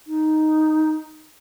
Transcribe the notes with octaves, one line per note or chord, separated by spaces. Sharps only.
D#4